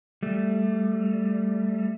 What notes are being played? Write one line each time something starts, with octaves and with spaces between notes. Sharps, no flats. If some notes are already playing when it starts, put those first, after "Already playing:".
G3 A3